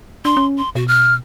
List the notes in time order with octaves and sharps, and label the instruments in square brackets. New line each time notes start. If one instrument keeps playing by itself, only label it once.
[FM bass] D4 [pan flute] C6
[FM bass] C#4
[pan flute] C6
[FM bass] B2 [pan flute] F#4
[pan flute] F6